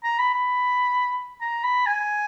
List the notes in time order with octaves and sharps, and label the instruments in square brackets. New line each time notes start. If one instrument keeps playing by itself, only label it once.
[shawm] A#5
B5
B5
A#5
B5
G#5